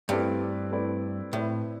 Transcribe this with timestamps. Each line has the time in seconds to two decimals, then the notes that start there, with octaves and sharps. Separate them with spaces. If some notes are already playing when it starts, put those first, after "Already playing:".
0.09 G2 A3 C4 E4 B4 D5
0.71 A3 C4 E4 B4 D5
1.33 A2 A3 C4 E4 B4 D5